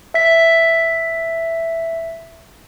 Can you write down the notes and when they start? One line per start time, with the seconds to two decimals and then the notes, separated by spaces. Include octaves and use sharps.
0.14 E5 B6